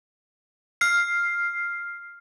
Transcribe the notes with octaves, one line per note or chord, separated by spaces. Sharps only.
F6 C7